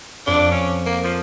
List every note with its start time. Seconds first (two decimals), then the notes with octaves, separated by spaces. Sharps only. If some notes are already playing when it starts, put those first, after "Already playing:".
0.27 F2 D4
0.51 C#4
0.86 A#3
1.04 F3